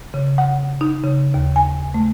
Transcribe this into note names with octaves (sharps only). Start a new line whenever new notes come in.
C#3
F#5
D#4
C#3
D#2
G#5
A3